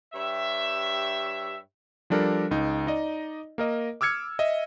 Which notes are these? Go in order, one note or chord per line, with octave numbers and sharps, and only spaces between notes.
G2 G4 C#5 E5
F3 G3 D4 A4 A#4
C#2 D#4
D#4 D5 D#5
A#3 A#4 D#5
D6 E6 F6 G#6 C#7
D#5 E5